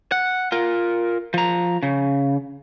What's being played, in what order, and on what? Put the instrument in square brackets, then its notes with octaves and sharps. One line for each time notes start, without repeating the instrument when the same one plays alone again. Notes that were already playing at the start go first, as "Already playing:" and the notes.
[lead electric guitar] F#5
F4 A#4
F3 A#5
C#3